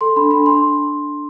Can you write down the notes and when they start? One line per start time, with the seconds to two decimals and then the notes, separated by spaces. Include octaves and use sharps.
0.01 A4 C6
0.16 D4 B5
0.31 D4 B5
0.46 D4 C6